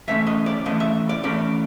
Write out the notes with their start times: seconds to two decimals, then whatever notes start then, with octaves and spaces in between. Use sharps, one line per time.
0.08 E3 A3 C#4 E5
0.27 D#5
0.46 D5
0.66 E3 A3 C#4 D#5
0.80 E5
1.09 D5
1.24 E3 A3 C#4 D5